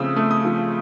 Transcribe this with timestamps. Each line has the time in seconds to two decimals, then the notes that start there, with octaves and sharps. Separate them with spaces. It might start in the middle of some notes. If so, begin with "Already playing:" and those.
Already playing: C#3 F3 A3 C4 D#6 E6
0.16 A3
0.31 D#6
0.45 F3